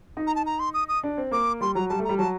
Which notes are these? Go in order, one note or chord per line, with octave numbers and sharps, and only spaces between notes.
D#4
A#5
A5
A#5
C6
D#6
D#6
D4
C4
A#3 D6
G3 C6
F#3 A#5
G3 A5
A3
G3 A#5
F#3 A5